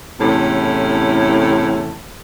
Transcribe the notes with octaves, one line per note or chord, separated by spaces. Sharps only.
E2 A2 C3 C#4 A4